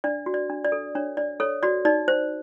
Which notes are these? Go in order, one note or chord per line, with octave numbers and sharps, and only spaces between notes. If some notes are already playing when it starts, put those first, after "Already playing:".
D4 D5
F#4
D5
D4
D5
A4
D4 C#5
D4 D5
A4 C#5
F#4 D5
D#4 D5
C5